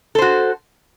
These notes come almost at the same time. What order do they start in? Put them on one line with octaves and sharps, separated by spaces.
A4 C5 F#4